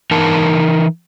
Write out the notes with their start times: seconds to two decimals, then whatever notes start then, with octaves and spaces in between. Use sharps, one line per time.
0.11 E3 D#4 A#4 A5